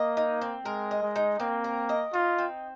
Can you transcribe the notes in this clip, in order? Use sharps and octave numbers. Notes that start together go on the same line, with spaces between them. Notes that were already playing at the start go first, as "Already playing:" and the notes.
Already playing: A#3 D#5
D#4
C4
G#3 A#4
D#5
G#3
D#4
A#3 C4
A#4
D#5
D#4 F4
C4